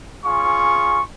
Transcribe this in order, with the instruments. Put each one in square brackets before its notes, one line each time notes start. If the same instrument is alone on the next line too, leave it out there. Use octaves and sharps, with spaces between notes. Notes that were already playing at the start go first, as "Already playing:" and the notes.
[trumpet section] C#4 F4 G#4 [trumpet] C#6